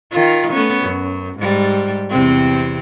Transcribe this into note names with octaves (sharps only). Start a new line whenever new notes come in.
D#3 F4
A3 B3 C#4
F#2
G#2 G3
E2 C3 C4